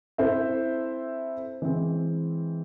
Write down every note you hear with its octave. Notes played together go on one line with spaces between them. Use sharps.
C4 E4 A4 C5 E5
E3 G#3 C4